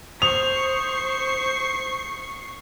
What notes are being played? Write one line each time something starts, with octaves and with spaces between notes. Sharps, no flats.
C5 C#6 D#6 C7 F7